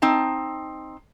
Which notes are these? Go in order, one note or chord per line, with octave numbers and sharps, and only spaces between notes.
C4 D#4 A5